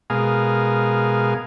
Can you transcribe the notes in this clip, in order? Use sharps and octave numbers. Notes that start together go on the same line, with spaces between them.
B2 G#3 G#4 A#4 F5